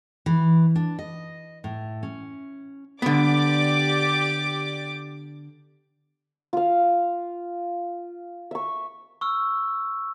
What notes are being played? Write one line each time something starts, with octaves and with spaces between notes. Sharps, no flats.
E3
D4
D#5
A2
C#4
D3 B3 G4 D5 D6
F4 F5
E5 C#6
C#6 E6 F6